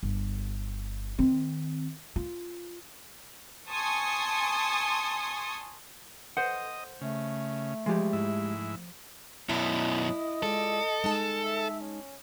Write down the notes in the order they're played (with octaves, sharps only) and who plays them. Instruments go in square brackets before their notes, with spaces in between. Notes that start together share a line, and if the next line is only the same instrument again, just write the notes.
[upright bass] G1
D#3 C4
F4
[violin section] G#5 A5 C6 C#6 D#6
[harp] C5 [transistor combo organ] D#5 [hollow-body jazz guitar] F#5
[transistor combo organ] C#3 [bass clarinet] A3
[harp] F3 [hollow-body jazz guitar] G#3 G4
[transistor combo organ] G#2 E4
[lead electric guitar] F#2 B2 [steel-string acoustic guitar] E4 [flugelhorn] D#5
[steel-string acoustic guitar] G#3 F4 D5 [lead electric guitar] A4
[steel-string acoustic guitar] G#3 D#4 A5
[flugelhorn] E5
C#4